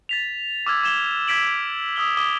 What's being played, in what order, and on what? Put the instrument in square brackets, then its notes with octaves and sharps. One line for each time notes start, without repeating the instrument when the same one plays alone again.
[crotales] A6 B6 F7
D6 E6 F6 G#6
D6 G#6 E7 G7
E6 G#6 B6 D7 F#7
D#6 E6 G7
D6 D#6 G7